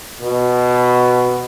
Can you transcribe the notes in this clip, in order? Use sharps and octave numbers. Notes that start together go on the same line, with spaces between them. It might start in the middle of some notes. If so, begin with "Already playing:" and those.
B2